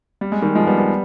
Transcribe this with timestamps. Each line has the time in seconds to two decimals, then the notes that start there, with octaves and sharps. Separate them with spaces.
0.21 G3
0.32 G#3
0.42 D#3 G3
0.55 F3 G#3
0.67 G3 B3
0.78 G3 B3